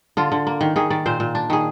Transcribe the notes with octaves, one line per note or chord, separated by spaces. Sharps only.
D3 F4
D3
A#3
D#3
D#3 G#4
D#3 D5
A#2 C5
A#2
D4
D#3 G#4